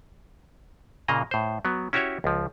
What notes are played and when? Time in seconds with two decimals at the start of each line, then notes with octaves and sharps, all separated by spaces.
1.08 A#2 C#3 A#3 D#5 A#5
1.31 A2 C5
1.65 F#3 B3
1.93 C#4 E4 F#4 G4 C#5 E5
2.24 C#2 F3